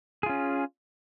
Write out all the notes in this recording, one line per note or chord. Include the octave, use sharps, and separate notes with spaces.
C#4 F4 G#4